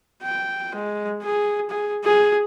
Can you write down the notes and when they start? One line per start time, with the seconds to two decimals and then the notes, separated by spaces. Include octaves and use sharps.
0.23 G5
0.75 G#3
1.23 G#4
1.69 G#4
2.05 G#4